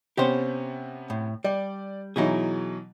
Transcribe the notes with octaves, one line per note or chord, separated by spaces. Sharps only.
C3 B3 C#4 G4 C5
A2
G3 D5
B2 E3 F#3 D#4 E4 G#4